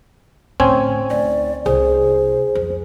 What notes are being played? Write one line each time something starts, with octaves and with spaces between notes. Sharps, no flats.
A2 D3 C4 C#4 G#5
D2 D#4 D5
C2 G#4 C5
F2